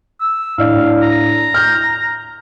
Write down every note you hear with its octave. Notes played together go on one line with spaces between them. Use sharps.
E6
A2 D4 D5 F5
A#5
F6 G6